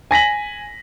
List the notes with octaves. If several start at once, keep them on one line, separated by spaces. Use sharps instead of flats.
G#5 A#6 B6 F#7